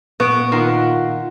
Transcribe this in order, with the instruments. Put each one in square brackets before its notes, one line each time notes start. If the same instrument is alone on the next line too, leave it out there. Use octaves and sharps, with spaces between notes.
[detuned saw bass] A#2 [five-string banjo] B3 [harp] C#6 F#6 D7
[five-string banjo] D#3 [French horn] F4 [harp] F#5 C6